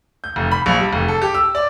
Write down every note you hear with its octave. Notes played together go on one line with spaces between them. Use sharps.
G6
F1
B5
A#1
G3
F1
A4
G4
E6
D5